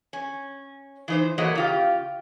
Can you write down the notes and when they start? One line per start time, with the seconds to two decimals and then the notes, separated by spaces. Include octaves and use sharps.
0.13 C#4
1.08 E3 D#4 C5
1.38 E3 F#3 A3 A#3 F#4 D#5
1.55 C#3 F4 G4